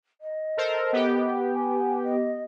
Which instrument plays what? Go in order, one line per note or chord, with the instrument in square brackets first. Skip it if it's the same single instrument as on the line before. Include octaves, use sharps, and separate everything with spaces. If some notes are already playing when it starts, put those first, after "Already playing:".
[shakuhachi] D#5
[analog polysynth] A4 A#4 C5
B3 G4
[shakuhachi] G#5
D#5